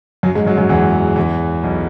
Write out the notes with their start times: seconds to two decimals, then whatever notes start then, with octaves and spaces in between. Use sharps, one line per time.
0.23 F#2 F#3
0.35 G#2 G#3
0.47 F#2 F#3
0.58 F#2 F#3
0.69 E2 E3
1.16 E2 E3
1.64 B1 B2